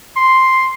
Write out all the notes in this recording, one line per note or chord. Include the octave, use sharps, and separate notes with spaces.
C6